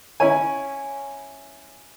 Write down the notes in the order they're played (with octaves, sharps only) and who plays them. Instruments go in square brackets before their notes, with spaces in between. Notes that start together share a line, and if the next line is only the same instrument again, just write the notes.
[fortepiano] C#4 E4 C#5 G#5